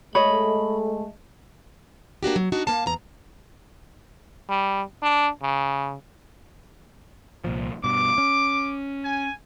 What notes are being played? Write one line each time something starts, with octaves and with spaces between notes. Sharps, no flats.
G#3 A3 C#5 D#5 B5
A#3 D4 F#4 G4
F#3
D4 D#4 F#4
A#3 F5 A5
E2 A#5
G3
D4
C#3
C2 A#2 F3
G2 B2 D6
C#4
G#5